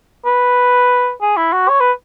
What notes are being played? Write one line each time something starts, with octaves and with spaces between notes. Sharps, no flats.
B4
G#4
E4
F#4
C#5
B4